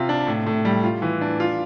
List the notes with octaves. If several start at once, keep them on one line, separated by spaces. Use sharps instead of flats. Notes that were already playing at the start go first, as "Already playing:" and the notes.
Already playing: C3 F4
D4
A2
A2
G3
F4
E3
D4
F4